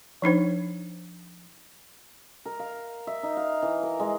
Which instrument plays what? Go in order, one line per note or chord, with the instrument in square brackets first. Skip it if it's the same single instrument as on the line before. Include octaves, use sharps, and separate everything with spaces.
[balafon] F3 D4 D#4 C5
[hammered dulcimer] A#4
F5
E5
D#4
F5
E3
A#4
G#3